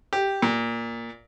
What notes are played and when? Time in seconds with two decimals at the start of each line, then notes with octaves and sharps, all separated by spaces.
0.13 G4
0.42 A#2